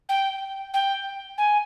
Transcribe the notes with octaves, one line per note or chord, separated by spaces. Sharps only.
G5
G5
G#5